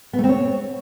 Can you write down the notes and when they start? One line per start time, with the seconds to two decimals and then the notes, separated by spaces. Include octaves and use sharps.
0.13 B3
0.19 A3
0.24 C4
0.29 C#5